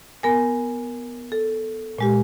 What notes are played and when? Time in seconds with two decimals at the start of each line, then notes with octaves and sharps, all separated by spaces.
0.23 B3 A#4 G#5
1.32 A4
1.99 A#2 G#3 G4